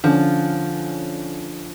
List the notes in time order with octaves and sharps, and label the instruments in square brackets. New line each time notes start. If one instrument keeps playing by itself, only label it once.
[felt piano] D3 C#4 [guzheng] F3